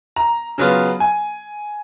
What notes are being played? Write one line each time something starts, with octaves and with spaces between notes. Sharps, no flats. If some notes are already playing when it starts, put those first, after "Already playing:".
A#5
C#3 F#3 B3 F4
G#5